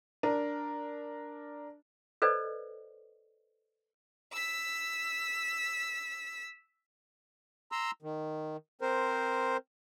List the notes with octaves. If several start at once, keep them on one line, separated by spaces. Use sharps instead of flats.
D4 A#4
A4 B4 C5 D5 D#5
E6 B6
A#5 C6 E6
D#3
C4 A#4 C5